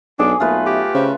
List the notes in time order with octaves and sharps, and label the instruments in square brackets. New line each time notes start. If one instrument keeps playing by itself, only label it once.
[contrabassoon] B1 [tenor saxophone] D4 [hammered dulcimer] G#4 [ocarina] D6
[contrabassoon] B1 [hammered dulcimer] A3 F4 B4 [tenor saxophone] A#3 [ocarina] E5
[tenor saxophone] G4
[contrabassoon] C#3 [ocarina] C5